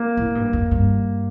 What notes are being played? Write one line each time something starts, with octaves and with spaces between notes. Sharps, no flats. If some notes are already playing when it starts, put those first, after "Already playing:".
Already playing: A#3
A2
G2
F2
G2